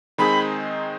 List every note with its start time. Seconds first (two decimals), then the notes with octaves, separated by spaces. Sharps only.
0.18 D#3 G#3 C4 D#4 G#4 B5